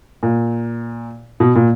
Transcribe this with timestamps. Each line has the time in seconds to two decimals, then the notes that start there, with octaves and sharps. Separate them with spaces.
0.23 A#2
1.40 B2
1.55 A#2